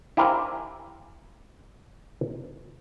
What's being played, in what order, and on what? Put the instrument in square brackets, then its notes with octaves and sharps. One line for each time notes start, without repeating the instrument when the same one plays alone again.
[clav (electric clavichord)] E4 G4 A#4 C5 F5 G#5